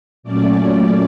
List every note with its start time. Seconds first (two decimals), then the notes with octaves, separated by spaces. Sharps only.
0.23 A#2 F#3 A3 C#4 D5